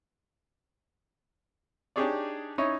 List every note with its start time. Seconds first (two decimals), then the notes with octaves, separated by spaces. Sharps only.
1.96 D4 D#4 G4 G#4 C#5 D5
2.58 C#4 D#4 E4 C#5